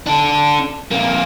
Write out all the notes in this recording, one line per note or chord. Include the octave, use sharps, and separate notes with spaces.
D4 A4
F2 A#3